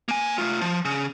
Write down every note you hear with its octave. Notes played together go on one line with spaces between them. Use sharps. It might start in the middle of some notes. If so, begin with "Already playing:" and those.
A#3 G#5
A3 F4
F3
C#3